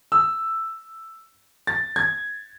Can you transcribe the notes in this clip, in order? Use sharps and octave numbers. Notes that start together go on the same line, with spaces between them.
E6
A6
G#6